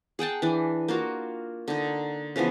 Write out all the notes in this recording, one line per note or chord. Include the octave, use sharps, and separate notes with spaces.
G#4 F#5 G5 A5
E3 D4
A#3 F4 F#4
D3 D#4
C#3 E3 F3 B3